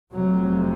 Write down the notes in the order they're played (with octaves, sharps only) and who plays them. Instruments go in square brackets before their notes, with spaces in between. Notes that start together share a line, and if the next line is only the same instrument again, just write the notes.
[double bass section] F1 F2 C3 F#3